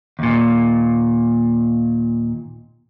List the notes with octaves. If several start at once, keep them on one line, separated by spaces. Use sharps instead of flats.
D#2 A#2